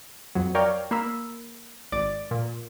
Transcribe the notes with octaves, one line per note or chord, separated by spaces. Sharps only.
F2 F#3
A#4 C#5 D5 F5 G5
A#3 A#4 B5 E6
G#1 D5 A6 D7
A#2